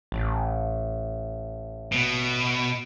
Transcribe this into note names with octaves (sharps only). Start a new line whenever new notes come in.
A1
B2